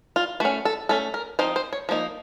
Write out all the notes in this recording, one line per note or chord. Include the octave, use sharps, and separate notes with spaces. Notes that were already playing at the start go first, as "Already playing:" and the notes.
F4
A3 C#4 F#4
A4
A3 C#4 A4
A#4
F3 C4 D#4 C5
C5
C#5
F3 A#3 D#4